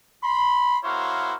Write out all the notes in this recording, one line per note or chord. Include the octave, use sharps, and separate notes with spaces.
B5 C6
A#3 E4 F#4 C5 C#5 F5